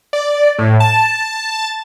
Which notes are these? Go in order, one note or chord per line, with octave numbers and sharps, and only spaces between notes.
D5
A2
A5